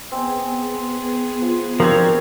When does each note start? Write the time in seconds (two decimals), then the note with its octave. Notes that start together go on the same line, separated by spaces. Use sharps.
0.12 B3 C4 G#4 G#5
1.42 F3
1.80 F3 C4 D4 F#4 G4 A#4 C#5